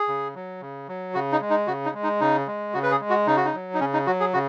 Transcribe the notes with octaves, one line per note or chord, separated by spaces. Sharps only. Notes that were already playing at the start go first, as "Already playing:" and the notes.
Already playing: G#4
C#3
F#3
C#3
F#3
C#3 F#4
D#4
G#3
D#4
C#3 F#4
D#4
G#3
D#4
C#3 D#4
G#3
C#3 F#4
B4
G#4
G#3
F#4
C#3 D#4
F#4
D#4
F#3
D#4
C#3 C#4
D#4
F#3 F#4
G#4
C#3 F#4